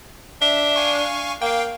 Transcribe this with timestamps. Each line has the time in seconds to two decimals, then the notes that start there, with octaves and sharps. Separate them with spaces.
0.42 D4 E5
0.76 F5 G#5 C#6
1.42 A#3 F5 G5